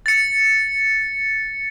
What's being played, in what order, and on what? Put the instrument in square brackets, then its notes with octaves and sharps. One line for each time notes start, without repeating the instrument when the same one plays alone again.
[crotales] A6 C#7